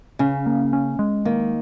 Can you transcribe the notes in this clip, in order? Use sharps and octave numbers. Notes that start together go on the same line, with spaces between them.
C#3 C#4
A#3
C#4
G#3
D#3 A#3